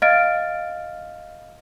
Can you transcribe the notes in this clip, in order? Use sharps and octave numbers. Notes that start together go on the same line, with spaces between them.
D#5 F5 F6 A6 D7